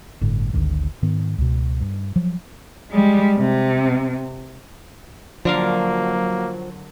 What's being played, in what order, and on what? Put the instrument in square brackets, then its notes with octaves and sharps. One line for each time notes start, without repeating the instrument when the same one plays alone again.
[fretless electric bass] G1 A2 D3
G#1 D2 G#2 D#3
G#2 D#3 B3
C#2 B2
G2
F3 F#3
[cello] G3 G#3
C3
[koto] D3 A#4 F5 [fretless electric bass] F3 [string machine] F#3 [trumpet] A#3